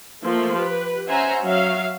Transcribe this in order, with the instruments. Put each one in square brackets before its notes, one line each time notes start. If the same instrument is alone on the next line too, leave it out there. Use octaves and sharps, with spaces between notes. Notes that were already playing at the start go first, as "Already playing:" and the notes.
[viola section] F3 A3 A#3
G4 B4
C#4 C5 E5 F#5 G#5 A#5
F#3 E5 F5